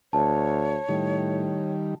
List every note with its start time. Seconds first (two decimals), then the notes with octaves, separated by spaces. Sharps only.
0.13 D2 C#5 A5
0.89 A2 D#3 G3